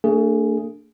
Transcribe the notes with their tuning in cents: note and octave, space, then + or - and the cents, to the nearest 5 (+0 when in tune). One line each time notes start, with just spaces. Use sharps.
A3 +45 D4 +0 G#4 +0